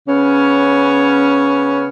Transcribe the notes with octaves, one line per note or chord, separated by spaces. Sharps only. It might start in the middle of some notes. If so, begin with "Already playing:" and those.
C#3 B3 C#4